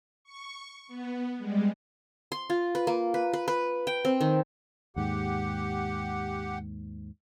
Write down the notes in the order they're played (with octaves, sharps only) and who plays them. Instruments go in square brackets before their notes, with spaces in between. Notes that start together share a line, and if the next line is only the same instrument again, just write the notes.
[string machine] C#6
B3
G3 G#3
[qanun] C6
F4
B4
A#3
B4
B4
B4
G5
C4
D#3
[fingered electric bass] D#2 G#2 [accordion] G4 F#5